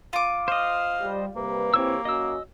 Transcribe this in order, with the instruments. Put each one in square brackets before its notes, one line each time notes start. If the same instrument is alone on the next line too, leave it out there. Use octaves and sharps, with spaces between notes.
[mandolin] F4 D6
[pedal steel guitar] C5 D#5 [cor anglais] F5
[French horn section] G3
[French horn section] C3 G3 B4 [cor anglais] A#3
[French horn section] D#2 E3 C4 [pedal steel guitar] G4 C#5 E6
[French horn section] F#2 C#4 F#4 [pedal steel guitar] D#5 E6